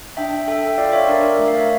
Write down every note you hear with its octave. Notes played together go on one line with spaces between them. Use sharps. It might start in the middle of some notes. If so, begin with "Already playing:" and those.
D4 E5 G5
A4 E5 G5
G5
F4 D5 F5
C#5 E5
D4 A#4 D5
A#4
A3 E5
F5
C#5 E5